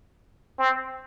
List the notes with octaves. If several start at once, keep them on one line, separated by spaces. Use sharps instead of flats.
C4